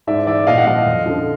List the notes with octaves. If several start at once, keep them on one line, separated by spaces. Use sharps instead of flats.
G#2 D5 E5
E3 D5 E5
A#2 D#5 F5
F#5
F3 D#5 F5
F2
D3 F3